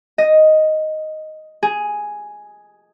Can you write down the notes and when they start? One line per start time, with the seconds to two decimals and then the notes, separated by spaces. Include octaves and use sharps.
0.18 D#5
1.63 G#4